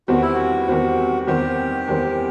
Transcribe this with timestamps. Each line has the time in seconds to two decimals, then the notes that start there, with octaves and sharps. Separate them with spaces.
0.08 E2 D#3 G3 C4 F#4
0.22 E4
0.35 F#4
0.68 E2 D#3 G3 C4
1.27 E2 D#3 G3 C4 G4
1.87 E2 D#3 G3 C4